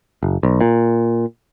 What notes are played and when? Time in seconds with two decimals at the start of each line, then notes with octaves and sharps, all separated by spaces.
0.23 F#1
0.43 B1
0.61 A#2